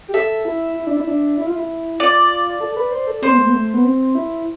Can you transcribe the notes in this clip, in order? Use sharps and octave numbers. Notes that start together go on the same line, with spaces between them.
G4
A4 E5
E4
E4
D4
E4
D4
E4
F4
E4
F4 D5
A4
A4
B4
C5
A4
C4 C5
B3
A3
B3
A3
B3
C4
E4